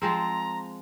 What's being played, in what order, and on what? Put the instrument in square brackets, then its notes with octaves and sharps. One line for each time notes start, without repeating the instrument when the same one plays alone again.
[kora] F3 G#3 C4 [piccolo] A#5